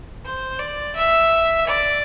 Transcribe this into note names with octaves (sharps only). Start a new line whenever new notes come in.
C5
D5
E5
D5